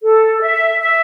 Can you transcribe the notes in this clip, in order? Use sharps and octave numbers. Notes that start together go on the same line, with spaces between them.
A4
E5
E5